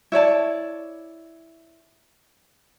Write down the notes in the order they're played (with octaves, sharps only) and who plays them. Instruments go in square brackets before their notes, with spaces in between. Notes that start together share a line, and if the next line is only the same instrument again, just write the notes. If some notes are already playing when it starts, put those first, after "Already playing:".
[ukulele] E4 C#5 D5 A5